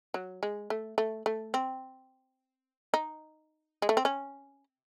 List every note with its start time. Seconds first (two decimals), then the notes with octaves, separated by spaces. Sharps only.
0.14 F#3
0.43 G#3
0.70 A3
0.98 A3
1.26 A3
1.54 C4
2.94 D#4
3.82 G#3
3.89 A3
3.97 C4
4.05 C#4